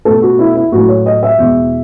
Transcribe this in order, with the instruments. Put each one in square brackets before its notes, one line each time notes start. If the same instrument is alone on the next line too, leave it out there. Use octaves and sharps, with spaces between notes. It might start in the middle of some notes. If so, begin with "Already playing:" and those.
[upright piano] B2 A3 A4
F#4
E4
E4
A2 F#3 A3 F#4
C#5
D#5
E5
E2 B2 G#3